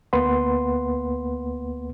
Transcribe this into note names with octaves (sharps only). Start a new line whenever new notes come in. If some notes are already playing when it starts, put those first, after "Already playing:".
D2 A#3 B3 B4 F#5 C6